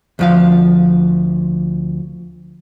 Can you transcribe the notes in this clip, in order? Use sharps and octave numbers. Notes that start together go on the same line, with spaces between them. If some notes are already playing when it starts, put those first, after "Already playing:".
D2 F3 F5